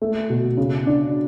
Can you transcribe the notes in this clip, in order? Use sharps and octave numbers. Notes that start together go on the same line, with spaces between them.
A3
B2
C#3
D4